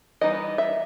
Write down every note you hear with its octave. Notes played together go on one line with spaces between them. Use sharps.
E3 G3 B3 D#4 D#5
E5